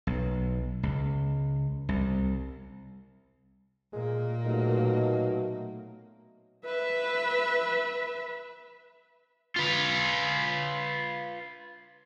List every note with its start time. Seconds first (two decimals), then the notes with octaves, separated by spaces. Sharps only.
0.07 B1
0.83 C#2
1.89 C2
3.93 A#2 G#3 A#3
4.44 B2 F#3 A3 D#4
6.66 B4 E5
9.56 F4 B4